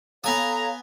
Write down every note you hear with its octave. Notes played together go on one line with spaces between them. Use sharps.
B3 A4 C#5 F5 G#5 A#5 D#6